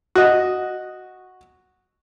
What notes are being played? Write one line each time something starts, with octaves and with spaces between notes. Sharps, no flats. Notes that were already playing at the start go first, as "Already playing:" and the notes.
F#4 D#5